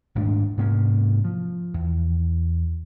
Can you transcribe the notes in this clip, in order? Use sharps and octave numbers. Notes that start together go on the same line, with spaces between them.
D#1 G#2 A3 D4
G#2 C3 A#3 C#4
F3
E2